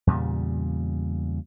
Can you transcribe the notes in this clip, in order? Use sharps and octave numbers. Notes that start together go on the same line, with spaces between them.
E2 A#2 C#3 G3